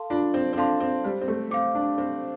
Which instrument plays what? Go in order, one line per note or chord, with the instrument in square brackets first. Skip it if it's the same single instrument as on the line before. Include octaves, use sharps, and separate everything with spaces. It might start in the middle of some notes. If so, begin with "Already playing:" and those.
Already playing: [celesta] A4 F5 A5 C6
[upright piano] D4 [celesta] F4
[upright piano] C4
C4
[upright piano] D4 [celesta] A4 F5 A5 C6
[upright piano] C4
[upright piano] G3 [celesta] C5
[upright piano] C4
A3
[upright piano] C4 [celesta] F5 D6
[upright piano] D4
[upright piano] C4 [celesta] C5